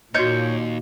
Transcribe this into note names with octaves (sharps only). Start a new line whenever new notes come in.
D#2 A#2 F#4 C#5 D#5 G6